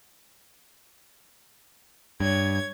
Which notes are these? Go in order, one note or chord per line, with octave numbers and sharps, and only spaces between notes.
G2 C#5 G#6